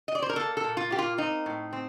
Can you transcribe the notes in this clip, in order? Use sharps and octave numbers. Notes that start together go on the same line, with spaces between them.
D#5
D5
C5
A#4
A#3 A4
A4
A#2
F4
A#3 G4
F4
C4 D#4
A2
C4